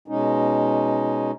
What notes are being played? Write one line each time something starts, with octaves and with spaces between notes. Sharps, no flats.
B2 G#3 C#4 D#4